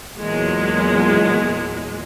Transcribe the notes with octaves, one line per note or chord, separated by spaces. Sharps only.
E2 A#2 F#3 G#3